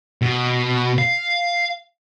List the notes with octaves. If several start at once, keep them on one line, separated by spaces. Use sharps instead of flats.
B2
F5